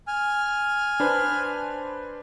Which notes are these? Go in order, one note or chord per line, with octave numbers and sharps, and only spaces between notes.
G#5 F6
D4 B4 C5